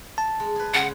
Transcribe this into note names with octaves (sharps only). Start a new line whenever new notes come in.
A5
G#3
G#4 B4
C#3 G#3 F#5